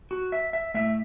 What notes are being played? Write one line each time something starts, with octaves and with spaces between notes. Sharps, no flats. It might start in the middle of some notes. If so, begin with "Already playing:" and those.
F#4
E5
E5
A2 A3 E5